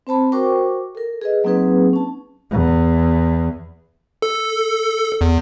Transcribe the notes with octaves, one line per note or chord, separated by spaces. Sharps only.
C4 C5 A5 B5
F#4 A#4 C5 G5 C#6 D6
A4 A#4
G#4 B4 D#5
F#3 A#3 C4 D#4 G#4 B4
C#4 A5
E2
A4
E2